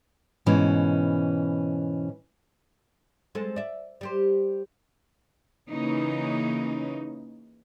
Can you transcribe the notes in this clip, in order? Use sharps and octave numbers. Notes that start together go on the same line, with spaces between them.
G#2 B2 E3 C#4
G#3 C4 A4
D5 E5
G3 G4 C5
C#3 E3 A#3 C#4 D#4